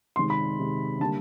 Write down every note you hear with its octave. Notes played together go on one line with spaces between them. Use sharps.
C3 D#3 G#3 C6
B5
C3 D#3 G#3
D3 G3 A#3 A5